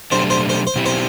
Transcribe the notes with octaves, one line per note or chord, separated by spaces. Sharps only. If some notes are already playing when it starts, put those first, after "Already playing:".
B2 F#3 A3 D4 G4 C5
C5
C5
C5
B2 F#3 C4 E4 G4
C5